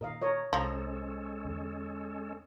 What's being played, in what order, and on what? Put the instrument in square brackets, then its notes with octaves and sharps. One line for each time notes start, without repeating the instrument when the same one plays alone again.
[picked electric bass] A#2 D#3 [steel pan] A#4 D#5 F5
[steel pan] A#4 C#5 D#5
[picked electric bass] C2 [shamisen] F3 [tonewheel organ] G#3 C#4 A4 [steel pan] D#5 A#5
[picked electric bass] E2 D3